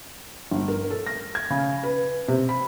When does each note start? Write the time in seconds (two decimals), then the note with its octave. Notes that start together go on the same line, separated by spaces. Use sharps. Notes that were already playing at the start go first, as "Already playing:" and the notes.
0.51 G1
0.68 A#4
0.90 A4
1.07 A#6
1.35 G#6
1.50 C#3
1.83 B4
2.28 C3
2.49 B5